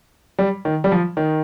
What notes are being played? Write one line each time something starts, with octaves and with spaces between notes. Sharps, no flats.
G3
D#3
G3
F3
D#3